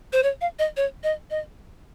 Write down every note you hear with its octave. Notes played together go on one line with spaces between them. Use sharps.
C5
C#5
F5
D#5
C#5
D#5
D#5